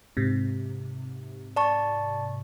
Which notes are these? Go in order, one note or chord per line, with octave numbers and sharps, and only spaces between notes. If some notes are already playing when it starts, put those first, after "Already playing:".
G#2 C3
D5 A5 C#6